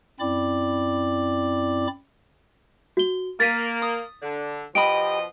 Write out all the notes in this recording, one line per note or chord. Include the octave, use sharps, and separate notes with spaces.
F#2 C4 E4 D5 B5 D6
F#4 G7
A#3 A#4 A6 B6 D#7
D#6
D3
B2 F3 G4 D#5 B5 D7